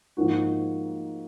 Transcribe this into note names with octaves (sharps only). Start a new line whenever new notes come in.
G#2 F3 A#3 D#4 F#4